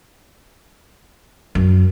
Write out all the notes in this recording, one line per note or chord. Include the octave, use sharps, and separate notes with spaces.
F#2